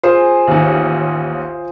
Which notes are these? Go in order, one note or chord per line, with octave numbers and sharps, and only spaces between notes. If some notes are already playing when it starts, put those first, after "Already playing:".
F4 G#4 C5
A1 D#2